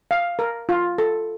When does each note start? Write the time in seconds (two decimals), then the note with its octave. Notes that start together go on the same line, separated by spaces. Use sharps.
0.11 F5
0.39 A#4
0.69 F4
0.98 A4